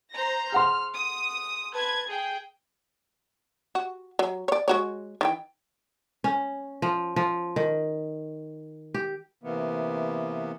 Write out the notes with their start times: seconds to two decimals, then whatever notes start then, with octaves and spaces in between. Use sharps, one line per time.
0.12 C5 A#5 A#6
0.52 G#4 F#5 C6 F6
0.94 D#6
1.73 B4 A5 G#6
2.07 G#4 G5
3.75 F#4
4.19 F#3
4.48 C#5 D5
4.68 G#3 F#4 C#5
5.21 D#3 E3 G5
6.24 C#4
6.82 F3
7.16 F3
7.56 D#3
8.94 G4
9.44 C3 E3 A#3 B3